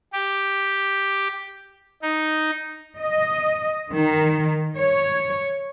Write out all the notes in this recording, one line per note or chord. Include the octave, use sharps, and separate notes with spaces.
G4
D#4
D#5
D#3
C#5